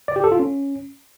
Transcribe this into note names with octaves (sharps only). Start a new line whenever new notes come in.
D5
G4
A4
F4
C#4